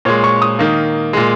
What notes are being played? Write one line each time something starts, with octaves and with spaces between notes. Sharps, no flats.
A#2 G#3 C#5
C#6
D#6
D#3 A#3
A#2 G#3